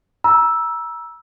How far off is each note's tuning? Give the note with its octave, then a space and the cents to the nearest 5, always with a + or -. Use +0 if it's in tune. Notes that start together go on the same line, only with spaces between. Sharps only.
A#5 +35 E6 +0